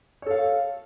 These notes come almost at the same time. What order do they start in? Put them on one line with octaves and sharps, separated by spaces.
C#5 A4 F5